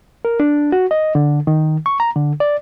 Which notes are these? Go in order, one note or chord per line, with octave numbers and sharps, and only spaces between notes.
A#4
D4
F#4
D#5
D3
D#3
C#6
A#5
D3
D5